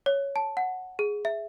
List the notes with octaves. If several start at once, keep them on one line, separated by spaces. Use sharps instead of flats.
C#5
A5
F#5
G#4
E5